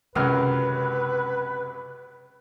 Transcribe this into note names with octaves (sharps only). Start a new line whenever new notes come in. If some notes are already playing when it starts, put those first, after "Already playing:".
C#2 F#2 C3 B4 F6